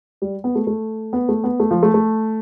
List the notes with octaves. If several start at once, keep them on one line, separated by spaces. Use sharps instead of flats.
G3
B3
A3
A3
B3
A3
B3
A3
F3
A3
A3